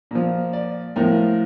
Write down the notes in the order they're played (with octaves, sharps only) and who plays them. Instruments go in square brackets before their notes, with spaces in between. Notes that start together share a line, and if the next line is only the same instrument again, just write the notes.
[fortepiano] A#2 F3
D5
A2 F3 A#4